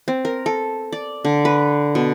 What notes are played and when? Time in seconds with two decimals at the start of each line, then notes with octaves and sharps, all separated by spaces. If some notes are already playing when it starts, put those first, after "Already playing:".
0.08 C4
0.25 A#4
0.46 A4
0.92 D5
1.25 D3
1.45 B4
1.95 B2